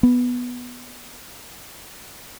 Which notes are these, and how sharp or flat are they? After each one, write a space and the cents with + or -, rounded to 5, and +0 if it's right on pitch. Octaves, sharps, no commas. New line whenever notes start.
B3 -5